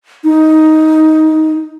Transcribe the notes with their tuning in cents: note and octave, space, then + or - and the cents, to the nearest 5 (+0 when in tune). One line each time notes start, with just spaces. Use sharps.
D#4 +10